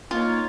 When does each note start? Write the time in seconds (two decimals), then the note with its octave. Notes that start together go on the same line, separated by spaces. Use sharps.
0.11 A#3 D#4 F4 A#4 C#5